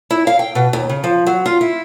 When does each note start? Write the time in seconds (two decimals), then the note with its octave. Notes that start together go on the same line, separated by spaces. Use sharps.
0.10 E4
0.27 F5
0.39 G5
0.55 B2
0.73 D#2
0.89 C#3
1.04 F3
1.26 F#3
1.46 F4
1.61 E4